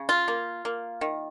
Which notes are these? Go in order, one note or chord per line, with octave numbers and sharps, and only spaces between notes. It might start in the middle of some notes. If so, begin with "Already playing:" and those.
Already playing: C#3
F4
A#3
A#3
D#3